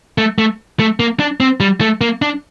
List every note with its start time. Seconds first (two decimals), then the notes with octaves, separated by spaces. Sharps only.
0.18 A3
0.38 A3
0.80 A3
1.00 A#3
1.20 D4
1.40 C4
1.60 G3
1.81 A3
2.01 A#3
2.22 D4